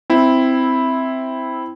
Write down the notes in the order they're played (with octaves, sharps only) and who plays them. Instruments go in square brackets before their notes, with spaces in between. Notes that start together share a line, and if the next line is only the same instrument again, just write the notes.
[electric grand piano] C4 E4